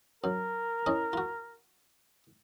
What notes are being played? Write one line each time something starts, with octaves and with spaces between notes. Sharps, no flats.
F#2 A#4
C#4 E4 D#5
F4 F#4